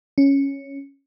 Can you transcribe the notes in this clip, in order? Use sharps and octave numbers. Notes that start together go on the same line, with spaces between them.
C#4